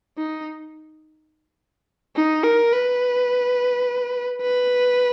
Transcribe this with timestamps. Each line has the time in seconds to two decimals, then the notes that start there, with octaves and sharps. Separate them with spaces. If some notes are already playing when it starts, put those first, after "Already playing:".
0.18 D#4
2.16 D#4
2.43 A#4
2.72 B4
4.41 B4